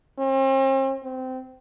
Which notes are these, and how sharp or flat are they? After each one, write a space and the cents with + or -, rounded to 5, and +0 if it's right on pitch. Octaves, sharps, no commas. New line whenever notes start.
C4 +45
C4 -20